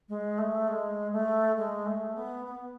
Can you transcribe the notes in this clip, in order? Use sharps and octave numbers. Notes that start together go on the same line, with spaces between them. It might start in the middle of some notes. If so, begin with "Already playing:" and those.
G#3
A3
G#3
A3
G#3
A3
B3
B3